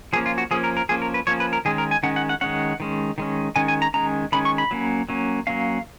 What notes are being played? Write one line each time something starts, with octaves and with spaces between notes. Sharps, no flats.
F3 A#3 C#4 G#4
F4
F#4
F3 A#3 C#4 G#4
A#4
A#4
F3 A#3 C#4 G#4
A#4
B4
F3 A#3 C#4 C#5
B4
A#4
D#3 G#3 C#4 G#4
A#4
G#5
D#3 G#3 C#4 F#5
F#5
F#5
D#3 G#3 C#4 F#5
D#3 G#3 C#4
D#3 G#3 C#4
D#3 G#3 C#4 G#5
G#5
A#5
D#3 G#3 C#4 A#5
D#3 G#3 C#4 B5
C#6
B5
F#3 A#3 C#4
F#3 A#3 C#4
F#3 A#3 C#4 F5